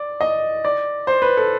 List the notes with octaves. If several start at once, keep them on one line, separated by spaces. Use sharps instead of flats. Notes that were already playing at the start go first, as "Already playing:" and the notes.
Already playing: D5
D#5
D5
C5
B4
A4